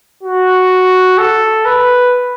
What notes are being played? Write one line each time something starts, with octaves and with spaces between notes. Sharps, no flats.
F#4
A4
B4